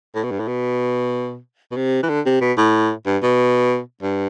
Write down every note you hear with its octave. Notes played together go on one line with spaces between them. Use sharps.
A2
B2
G2
A2
B2
B2
C3
E3
D3
C3
B2
A2
G2
B2
G2